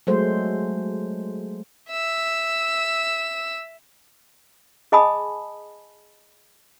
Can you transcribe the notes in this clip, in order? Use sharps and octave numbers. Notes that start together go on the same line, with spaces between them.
F#3 G#3 A3 C5
E5 E6
G#4 D#5 G#5 A5 B5 D#6